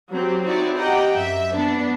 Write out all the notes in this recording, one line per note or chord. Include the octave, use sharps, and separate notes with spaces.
F#3 C4 G4
C4 D#4 E4 F#4 C#5 D5
G4 D#5 F#5 G5 A#5
F#2 E5
B3 D4